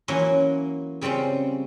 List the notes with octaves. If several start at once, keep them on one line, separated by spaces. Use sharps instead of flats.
E3 F#3 A#3 C#4 F4
C#3 G3 C4 C#4 F4